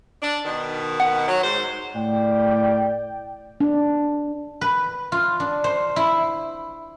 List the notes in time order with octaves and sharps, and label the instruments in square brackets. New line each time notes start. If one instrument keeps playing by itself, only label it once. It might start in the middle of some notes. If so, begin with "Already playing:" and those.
[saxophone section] D4
B2 D#3
[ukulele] F#5
[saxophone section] F#3
G#2 C5
[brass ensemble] A2 D5 G5
[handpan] D4
[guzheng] B4
F4
D4
C5
E4